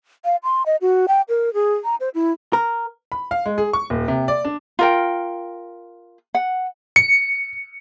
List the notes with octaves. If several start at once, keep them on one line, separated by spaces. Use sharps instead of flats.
F5
C6
D#5
F#4
G5
A#4
G#4
A#5
C5
E4
A#4
B5
F5
G#3
G#4
C#6
D#1
C3
D5
D4
F4 A#4 G5
F#5
C#7